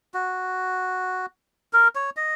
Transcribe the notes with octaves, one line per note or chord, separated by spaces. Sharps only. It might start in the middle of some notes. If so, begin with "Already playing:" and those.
F#4
A#4
C#5
D#5